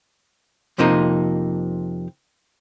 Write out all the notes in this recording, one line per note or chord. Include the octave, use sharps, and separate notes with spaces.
F2 C3 F3 A#3 D#4 A#5